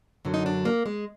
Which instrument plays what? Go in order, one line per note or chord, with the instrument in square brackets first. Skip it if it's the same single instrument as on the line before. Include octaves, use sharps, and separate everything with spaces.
[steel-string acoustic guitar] F#2 D3 F#3
D#4
D4
A#3
G#3